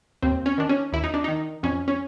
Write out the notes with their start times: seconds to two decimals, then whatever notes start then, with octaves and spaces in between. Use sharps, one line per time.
0.22 D#2 C4
0.46 C#4
0.58 D#3 D4
0.69 C#4
0.93 D#2 E4
1.04 D#4
1.14 D4
1.24 D#3 D#4
1.63 F2 C#4
1.88 C#4